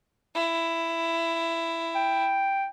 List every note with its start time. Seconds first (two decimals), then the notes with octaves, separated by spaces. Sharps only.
0.35 E4
1.95 G5